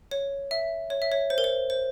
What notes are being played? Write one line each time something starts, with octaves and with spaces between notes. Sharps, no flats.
C#5
E5
C#5
E5
C#5
C5
A#4
C5
C5